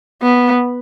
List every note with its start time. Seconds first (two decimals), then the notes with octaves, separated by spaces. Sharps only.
0.22 B3